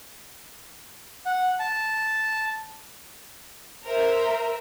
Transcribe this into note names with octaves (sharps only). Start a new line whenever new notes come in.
F#5
A5
A#4 C5 E5